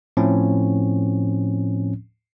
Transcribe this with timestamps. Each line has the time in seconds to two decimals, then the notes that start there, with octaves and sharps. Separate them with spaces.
0.17 A2 F3 C4 C#4